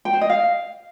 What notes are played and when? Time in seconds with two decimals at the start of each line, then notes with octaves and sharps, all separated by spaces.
0.05 G5
0.13 C5
0.21 D#5
0.30 F5